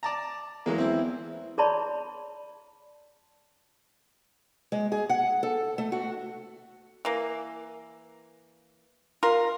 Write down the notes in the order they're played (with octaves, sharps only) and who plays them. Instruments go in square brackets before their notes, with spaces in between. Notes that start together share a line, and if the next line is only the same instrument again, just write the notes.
[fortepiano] D5 A5 A#5
[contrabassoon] E2 [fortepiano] F#3 G#3 A#3
[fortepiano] C4 E4
[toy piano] G#4 C#5 D5 A5 B5 C6
[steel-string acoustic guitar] G#3
G#4
F#5
A4
A3
F#4
[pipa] E3 A#3
F4 A#4